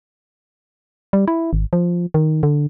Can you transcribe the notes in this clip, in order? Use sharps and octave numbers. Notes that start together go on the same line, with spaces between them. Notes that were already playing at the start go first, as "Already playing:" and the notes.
G3
E4
G#1
F3
D#3
D3